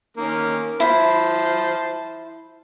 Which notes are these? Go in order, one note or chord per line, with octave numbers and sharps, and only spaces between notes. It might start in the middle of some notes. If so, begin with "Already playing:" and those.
D#3 A#3 C#4
E4 C5 A5